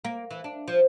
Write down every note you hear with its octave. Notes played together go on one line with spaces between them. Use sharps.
A#3
E3
D4
F3